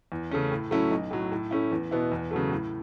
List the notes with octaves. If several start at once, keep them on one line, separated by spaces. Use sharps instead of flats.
E2
C#3 A3 C#4
A2
F#3 A3 C#4 E4
B1
A2 F#3
A2
A3 C#4 E4
E2
B2 B3 E4
E2
C#3 F#3 A3
A2